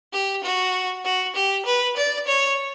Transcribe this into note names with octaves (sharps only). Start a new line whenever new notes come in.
G4
F#4
F#4
G4
B4
D5
C#5